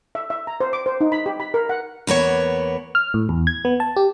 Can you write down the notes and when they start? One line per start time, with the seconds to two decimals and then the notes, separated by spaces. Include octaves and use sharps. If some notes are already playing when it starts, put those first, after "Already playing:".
0.15 E5
0.30 E5
0.47 A#5
0.60 C5
0.73 D6
0.86 C5
1.01 D#4
1.12 B5
1.26 G4
1.40 B5
1.54 A#4
1.69 F#5
2.07 E2 A#3 B3 C#5
2.95 F6
3.14 A2
3.29 E2
3.47 G#6
3.65 B3
3.80 A5
3.97 G4